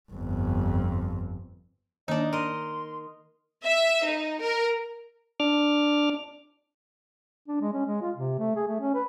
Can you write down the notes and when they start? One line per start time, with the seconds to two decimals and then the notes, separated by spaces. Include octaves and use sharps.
0.12 G1 F2
2.08 D#3 A#3 D4 D#4 D#5
2.33 A#4 D#5 C6
3.65 E5
4.06 D#4
4.41 A#4
5.40 D4 D6 F6
7.48 D4
7.61 G#3
7.73 C#4
7.87 G#3
8.01 F4
8.16 C3
8.39 A3
8.56 G#4
8.68 A3
8.81 C#4
8.95 B4